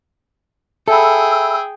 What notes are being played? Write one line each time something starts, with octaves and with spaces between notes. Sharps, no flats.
G#4 A4 E5 G5 G#5 B5 E6